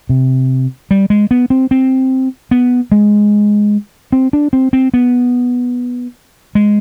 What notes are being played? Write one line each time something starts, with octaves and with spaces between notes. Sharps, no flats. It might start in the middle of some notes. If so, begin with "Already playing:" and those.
C3
G3
G#3
B3
C4
C4
B3
G#3
C4
D4
C4
C4
B3
G#3